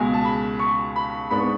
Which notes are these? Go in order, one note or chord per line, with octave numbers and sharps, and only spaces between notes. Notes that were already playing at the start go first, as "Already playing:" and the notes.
Already playing: C#2 B2 G#3 G#5
A5
B5
C#6
B5
G#2 G#3 B3 D4 B5
C#6